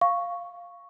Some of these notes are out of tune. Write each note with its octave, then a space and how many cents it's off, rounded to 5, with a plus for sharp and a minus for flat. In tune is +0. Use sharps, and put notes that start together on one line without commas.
F5 +0 C#6 +0